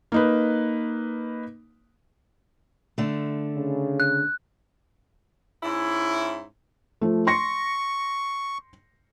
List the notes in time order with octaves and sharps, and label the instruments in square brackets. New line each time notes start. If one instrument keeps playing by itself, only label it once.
[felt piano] A#3 D#4 B4
[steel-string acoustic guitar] D3 A3
[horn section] C#3
[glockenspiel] F#6
[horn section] G#2 C#4 E4
[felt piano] F3 A3
[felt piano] C6 A#6 C#7 [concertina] C#6